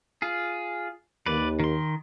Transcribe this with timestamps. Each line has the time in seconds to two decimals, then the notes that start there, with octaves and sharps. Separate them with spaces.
0.22 F4 G#4
1.26 D#2 B4 D5
1.60 D#3 C6